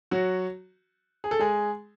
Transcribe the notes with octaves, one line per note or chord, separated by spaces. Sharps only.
F#3 F#4
G#4
A4
G#3 G#4